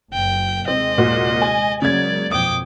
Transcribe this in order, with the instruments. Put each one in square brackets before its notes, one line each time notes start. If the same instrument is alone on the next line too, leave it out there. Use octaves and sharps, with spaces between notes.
[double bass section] F#1 F#2 [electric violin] G5
[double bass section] D#2 C3 G#3 [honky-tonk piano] C4 [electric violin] D#5
[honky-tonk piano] A#2 F#4
G#5
[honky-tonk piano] C#3 G#6 [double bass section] F#3 G#3 A#3 [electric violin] D5
[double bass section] F2 B2 [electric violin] G5 D6 [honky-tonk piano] D#6